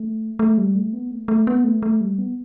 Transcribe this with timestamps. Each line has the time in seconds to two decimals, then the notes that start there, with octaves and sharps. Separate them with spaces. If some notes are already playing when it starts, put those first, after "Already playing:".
Already playing: A3
0.39 A3
0.58 G3
0.75 A3
0.93 B3
1.11 A3
1.28 A3
1.47 B3
1.64 A3
1.83 A3
2.01 G3
2.18 B3